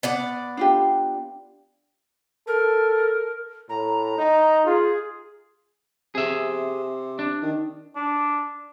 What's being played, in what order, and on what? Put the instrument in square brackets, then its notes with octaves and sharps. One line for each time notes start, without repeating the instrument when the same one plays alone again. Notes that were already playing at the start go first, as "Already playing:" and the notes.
[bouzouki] B3 D5 F#5
[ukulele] D4 F4 G4
[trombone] A4 [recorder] A#4
[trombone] A2 [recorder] A#5
[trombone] D#4
[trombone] F4 [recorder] G#4
[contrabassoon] C3 [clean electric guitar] G#4 E5
[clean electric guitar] D4
[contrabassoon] D#3
[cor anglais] D4